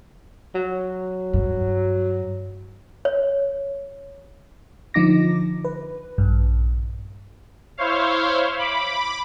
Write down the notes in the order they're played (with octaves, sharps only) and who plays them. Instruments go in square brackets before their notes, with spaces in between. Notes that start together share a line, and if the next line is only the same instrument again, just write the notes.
[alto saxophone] F#3
[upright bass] G2
[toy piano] C#5
[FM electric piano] D3 F3 D#4 D6 A#6
B4
A#1 G2
[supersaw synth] E4 C5 C#5 F5
B5 D6